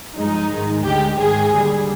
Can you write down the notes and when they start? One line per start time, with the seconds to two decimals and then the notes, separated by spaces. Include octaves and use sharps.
0.16 G2 F3 G#3 D#4
0.50 G#2 D#3 G#3
0.84 D2 D3 G#3 G4
1.17 G#2 D#3 G#3 G#4
1.52 D#2 D3 G3